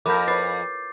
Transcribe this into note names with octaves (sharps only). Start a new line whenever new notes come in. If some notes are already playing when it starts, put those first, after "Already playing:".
F2 A4 A#4 D6 G6
B4 C#5 D6 A6 C7